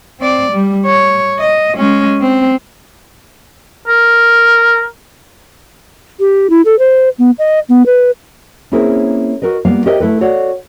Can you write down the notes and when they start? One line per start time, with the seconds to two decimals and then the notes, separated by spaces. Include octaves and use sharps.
0.20 C4 D5
0.52 G3
0.86 C#5
1.39 D#5
1.77 G#3 C#4
2.21 C4
3.88 A#4
6.20 G4
6.50 E4
6.65 A4
6.79 C5
7.19 B3
7.39 D#5
7.69 B3
7.86 B4
8.72 A#3 C4 C#4 E4 G#4 A#4
9.42 F#4 A#4 B4 D#5
9.65 G3 A#3 B3 F4 F5
9.86 G4 A#4 C5 D#5 E5 G5
10.00 A3 E4 A4 B4
10.21 F#4 A4 C#5 D5 F5 F#5